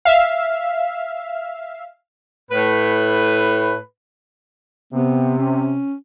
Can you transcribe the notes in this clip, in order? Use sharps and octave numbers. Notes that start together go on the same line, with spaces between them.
E5 F5
A2 B4
C3 B3
C#4